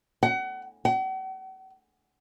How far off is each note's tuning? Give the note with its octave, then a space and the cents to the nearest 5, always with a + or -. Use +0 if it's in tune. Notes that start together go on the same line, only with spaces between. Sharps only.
F#5 +30
F#5 +45